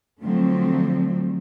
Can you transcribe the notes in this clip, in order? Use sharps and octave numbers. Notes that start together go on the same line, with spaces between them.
D3 F3 F#3 A3 C4